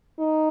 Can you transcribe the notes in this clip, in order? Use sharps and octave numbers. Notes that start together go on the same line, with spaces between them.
D#4